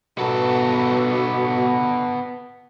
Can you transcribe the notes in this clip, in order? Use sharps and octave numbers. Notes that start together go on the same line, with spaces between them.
B2 B3 A4